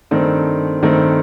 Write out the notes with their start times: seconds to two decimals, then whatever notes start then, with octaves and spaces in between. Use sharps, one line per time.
0.11 G2 D#3 A3 C4
0.82 G2 D#3 A3 C4